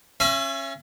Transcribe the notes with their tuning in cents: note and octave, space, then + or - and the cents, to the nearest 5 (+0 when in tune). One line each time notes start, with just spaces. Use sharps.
C#4 -20 E5 +35 G#5 +30